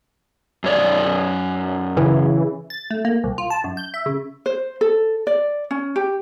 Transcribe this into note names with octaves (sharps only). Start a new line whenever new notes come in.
F#2 C#5 D5
C#3 E3
A6
A3
A#3
C2
F4
A5
F#2
G6
E5
C#3
C5
A4
D5
C#4
G4